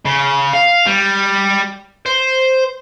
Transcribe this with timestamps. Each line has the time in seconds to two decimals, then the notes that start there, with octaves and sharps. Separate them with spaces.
0.05 C#3
0.53 F5
0.87 G3
2.06 C5